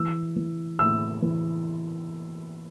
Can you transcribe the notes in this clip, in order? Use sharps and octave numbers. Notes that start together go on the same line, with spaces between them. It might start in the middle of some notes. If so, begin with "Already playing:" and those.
Already playing: E3 E6
E3
A2 E6
E3